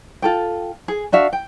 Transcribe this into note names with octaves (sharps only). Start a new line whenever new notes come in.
F4 A4 G5
G#4
D4 F#4 E5 F5
G5